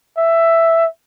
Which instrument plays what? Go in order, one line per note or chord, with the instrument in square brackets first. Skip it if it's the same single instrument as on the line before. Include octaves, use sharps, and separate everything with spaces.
[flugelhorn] E5